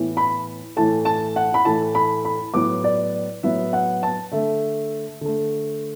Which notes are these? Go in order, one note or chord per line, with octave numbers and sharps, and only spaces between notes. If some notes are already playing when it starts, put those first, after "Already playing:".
Already playing: A2 E3 B3
B5
A2 E3 A3 A5
A5
F#5
B5
A2 E3 A3 A5
B5
B5
A2 F#3 B3 D6
D5
A2 F#3 B3 E5
F#5
A5
D3 A3 E5
D3 A3